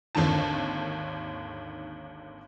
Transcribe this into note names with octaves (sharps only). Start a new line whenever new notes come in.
G#1 D#2 D3 D#3 A5